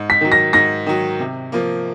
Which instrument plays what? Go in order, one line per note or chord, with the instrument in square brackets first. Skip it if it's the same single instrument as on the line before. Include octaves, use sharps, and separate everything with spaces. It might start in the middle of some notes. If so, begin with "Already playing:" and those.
Already playing: [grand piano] G#2
[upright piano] B6
[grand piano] D#3 F#3
[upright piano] A#6
[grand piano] G#2 [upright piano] A#6
[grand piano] D#3 F#3
C3
F3 A#3